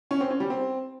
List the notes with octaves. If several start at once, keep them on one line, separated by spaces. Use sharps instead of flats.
C#4
C4
C#4
G3
C4